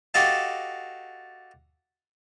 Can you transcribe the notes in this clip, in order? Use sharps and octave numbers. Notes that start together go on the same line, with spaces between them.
F#4 G4 A4 D#5 F5 A5